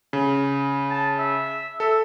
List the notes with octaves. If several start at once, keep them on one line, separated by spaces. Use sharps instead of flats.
C#3
A5
E5
A4 E5